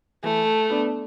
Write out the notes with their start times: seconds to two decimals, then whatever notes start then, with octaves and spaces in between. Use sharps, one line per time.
0.23 E3 A3
0.70 B3 D4